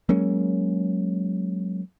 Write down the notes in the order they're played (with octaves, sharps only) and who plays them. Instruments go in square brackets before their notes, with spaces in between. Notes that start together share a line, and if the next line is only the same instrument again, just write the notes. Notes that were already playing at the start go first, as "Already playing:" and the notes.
[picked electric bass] F#3 G#3 A#3 C#4